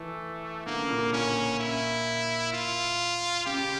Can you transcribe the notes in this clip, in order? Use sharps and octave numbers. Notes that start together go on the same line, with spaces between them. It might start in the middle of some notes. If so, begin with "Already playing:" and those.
Already playing: E3 A3
D3 A#3
C#3
A#2
C#3
A#2 C#4
E4
F4
C#3 G4